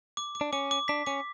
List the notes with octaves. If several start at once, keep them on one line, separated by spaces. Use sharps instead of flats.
D6
D6
D4
C#4 D6
D6
D4 B6
C#4 D6